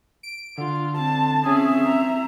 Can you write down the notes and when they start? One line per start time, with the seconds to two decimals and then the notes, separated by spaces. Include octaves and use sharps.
0.23 D7
0.58 D3 F4
0.97 C4 A5
1.46 C4 C#4 G#4 E5
1.85 A#5